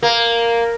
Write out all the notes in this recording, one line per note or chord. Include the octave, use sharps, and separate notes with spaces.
A#3